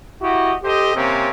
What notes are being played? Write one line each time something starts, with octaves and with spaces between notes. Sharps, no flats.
E4 F#4 G4 D#5
G4 A4 C5 D#5
C3 A#3 C4 C#4